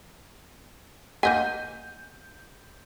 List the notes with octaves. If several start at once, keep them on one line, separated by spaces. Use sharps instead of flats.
A#3 D#5 F#5 G#5 G6 D#7